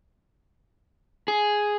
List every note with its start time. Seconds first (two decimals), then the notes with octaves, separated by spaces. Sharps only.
1.28 G#4